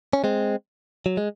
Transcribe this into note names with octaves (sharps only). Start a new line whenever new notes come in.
C#4
G#3 C4
F#3
G#3